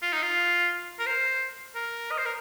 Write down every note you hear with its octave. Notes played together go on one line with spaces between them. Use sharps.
F4
D#4
F4
A#4
C5
A#4
D#5
C5
A#4